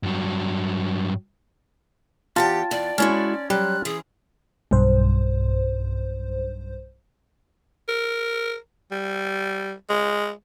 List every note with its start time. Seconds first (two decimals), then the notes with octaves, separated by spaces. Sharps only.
0.03 G2 F#3
2.36 E2 F4 G4 F#5 G5 A5
2.71 E2 D5
2.98 G#3 C#4 E4 F#4 C6
3.50 F#3 G3 F#6
3.85 E3 G#4
4.71 B1 G2 C5
7.88 A#4
8.91 G3
9.90 G#3